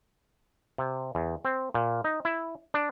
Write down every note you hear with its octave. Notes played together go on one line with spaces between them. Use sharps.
C3
E2
C4
A#2
D#4
E4
D4